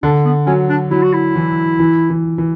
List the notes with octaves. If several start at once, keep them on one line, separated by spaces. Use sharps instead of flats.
D3 D4
B3
F#3 C#4
D4
F#3 E4
F#4
E4
E3
E3
E3
E3